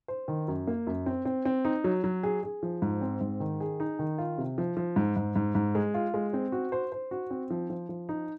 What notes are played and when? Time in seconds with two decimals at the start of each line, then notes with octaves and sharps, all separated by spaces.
0.08 C5
0.28 D#3
0.48 F#2
0.67 A#3
0.87 F#2
1.06 C4
1.25 C4
1.45 C4
1.65 D#4
1.84 F#3
2.04 F#3
2.23 G#4
2.43 G#4
2.63 F3
2.82 G#2
3.01 C4
3.21 G#2
3.40 D#3
3.60 G#4
3.80 D#4
3.99 D#3
4.18 F4
4.38 C3
4.58 F3
4.77 F3
4.96 G#2
5.16 G#2
5.36 G#2
5.55 G#2
5.75 G#3
5.94 F4
6.14 G#3
6.33 C4
6.52 F#4
6.72 C5
6.92 C5
7.11 F#4
7.30 C4
7.50 F3
7.70 F3
7.89 F3
8.09 D#4